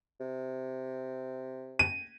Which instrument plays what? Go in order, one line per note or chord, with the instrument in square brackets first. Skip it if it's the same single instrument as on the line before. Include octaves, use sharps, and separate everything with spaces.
[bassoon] C3
[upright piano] D#7